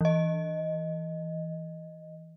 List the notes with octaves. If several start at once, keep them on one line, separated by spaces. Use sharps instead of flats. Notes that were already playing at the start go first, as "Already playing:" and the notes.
E3 D#5